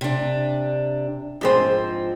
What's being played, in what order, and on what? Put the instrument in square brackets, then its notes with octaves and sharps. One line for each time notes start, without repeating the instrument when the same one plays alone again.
[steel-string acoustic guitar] C3 D4
[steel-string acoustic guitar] G#2 F3 C4 [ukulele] D4 G#4 C5